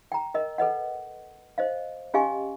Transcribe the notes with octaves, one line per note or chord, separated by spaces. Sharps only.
G5 A#5
A#4 D#5
A4 B4 D#5 F#5
C5 D#5 F5
C#4 G4 D#5 F5 G#5 C#6